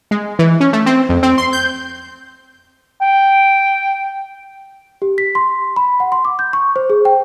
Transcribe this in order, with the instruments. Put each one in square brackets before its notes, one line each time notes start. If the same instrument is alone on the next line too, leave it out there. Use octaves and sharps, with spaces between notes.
[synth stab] G#3
E3
C#4
A3
C4
F2
C4
C6
G6
[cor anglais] G5
[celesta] G4
B6
C6
B5
F#5
C6
D6
G6
C#6
C5
G#4
G5